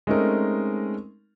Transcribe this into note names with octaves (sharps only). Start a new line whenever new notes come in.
G#3 A3 C4 C#4 D#4 A#4